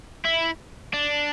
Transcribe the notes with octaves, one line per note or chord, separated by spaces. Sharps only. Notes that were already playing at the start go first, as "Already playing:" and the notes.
E4
D4